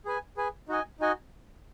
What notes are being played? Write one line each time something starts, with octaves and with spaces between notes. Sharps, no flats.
G#4 B4 G#5
G#4 B4 G#5
D#4 F#4 D#5 G#5
D#4 F#4 D#5 G#5